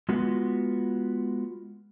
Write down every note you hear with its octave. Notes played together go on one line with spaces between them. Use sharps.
G#3 B3 F4 F#4